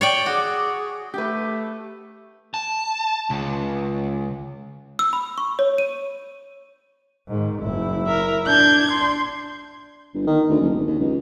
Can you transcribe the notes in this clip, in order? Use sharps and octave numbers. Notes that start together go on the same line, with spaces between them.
C#5 D5 G5
F#4 G#4 D5
A3 G4 B4
A5
C#2
E6
B5
C#6
C#5
D#7
G#2 D#3
F#1 E4
A#4 E5
D4 G6 G#6
C6
G1
D#3
D2
F#1
G#1
D#2
C#2